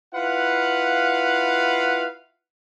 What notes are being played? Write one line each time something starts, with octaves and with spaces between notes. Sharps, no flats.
E4 F4 B4 F5 F#5